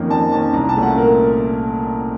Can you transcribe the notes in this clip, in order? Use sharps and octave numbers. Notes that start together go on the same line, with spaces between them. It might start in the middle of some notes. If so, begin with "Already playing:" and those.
Already playing: F2 D#3 A#3 C#4
F2 A5
D#3 A#3 C#4 A5
C2 A#5
A5
A#2 A3 C#4
F#5
A#4